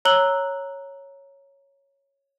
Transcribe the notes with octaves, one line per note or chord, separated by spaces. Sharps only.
C#5 A#5 E6 F#6 F#7 G7